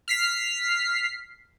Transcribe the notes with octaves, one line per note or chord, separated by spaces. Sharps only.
F6 B6 C7